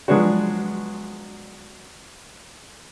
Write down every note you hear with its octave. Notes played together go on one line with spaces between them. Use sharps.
F3 F#3 G#3 B3 D4 F#4